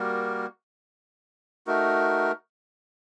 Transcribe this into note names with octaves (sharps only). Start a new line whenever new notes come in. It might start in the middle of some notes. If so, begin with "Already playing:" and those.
Already playing: G3 A#3 F#4 A#4
A3 D#4 F#4 A#4